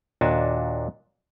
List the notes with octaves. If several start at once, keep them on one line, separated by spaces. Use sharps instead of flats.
D#2 A#2 D4 F#4 G#5 A5